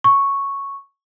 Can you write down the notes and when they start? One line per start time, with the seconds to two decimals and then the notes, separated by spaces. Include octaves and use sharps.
0.04 C#6